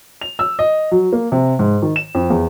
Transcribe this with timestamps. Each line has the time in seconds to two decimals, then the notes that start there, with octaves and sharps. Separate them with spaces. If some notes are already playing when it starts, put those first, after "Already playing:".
0.21 F7
0.39 E6
0.59 D#5
0.91 F#3
1.13 A#3
1.32 C3
1.59 G#2
1.82 D#3
1.96 E7
2.15 F2
2.30 E2